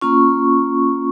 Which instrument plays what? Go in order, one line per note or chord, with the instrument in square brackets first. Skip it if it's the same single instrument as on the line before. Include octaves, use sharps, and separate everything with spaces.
[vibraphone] A#3 C#4 F4 C#6